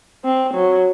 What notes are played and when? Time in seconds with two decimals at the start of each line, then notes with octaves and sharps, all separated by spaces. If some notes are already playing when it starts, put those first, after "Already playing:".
0.24 C4
0.54 F#3